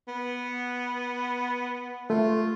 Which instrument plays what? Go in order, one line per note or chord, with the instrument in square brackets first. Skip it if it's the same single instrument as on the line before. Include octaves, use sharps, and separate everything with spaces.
[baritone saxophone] B3
[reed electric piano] A3 [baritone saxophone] F4